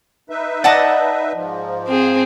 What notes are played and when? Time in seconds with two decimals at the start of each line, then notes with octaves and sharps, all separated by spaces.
0.30 D#4 B4 E5
0.64 D5 D#5 F#5 A5 D6
1.35 G#2 F3
1.88 C4 G#4